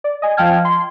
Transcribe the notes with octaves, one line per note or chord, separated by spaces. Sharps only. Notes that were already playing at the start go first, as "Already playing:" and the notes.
D5
D#5 G#5
F3 F5 G5 A5 F6 G#6
C6